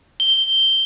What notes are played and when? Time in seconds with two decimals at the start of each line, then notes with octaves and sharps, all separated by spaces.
0.20 G7